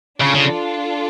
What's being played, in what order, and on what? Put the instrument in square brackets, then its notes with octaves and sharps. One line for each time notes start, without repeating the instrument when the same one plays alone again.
[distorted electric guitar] C#3 [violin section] D4 F4 A4
[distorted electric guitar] C#3